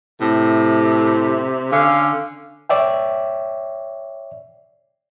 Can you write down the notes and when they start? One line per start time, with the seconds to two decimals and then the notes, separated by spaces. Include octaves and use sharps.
0.21 A2 C3
1.72 D3 C#4 F5
2.69 C#5 D5 E5 G5